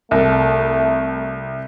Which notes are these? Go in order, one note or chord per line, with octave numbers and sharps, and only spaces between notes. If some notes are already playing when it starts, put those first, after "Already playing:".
C2 A3